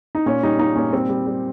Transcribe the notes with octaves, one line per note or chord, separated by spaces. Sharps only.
D#4
A#2 C#4
G3 D#4
A#2 D#4
A#2 C#4
G3 C4
G3
G3